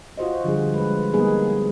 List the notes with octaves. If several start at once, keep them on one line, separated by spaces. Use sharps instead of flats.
F4 F#4 C5 D#5
D3 F3 G3 G#4
G#3 B4
G3 A#3 B3 D#4 G#4 B4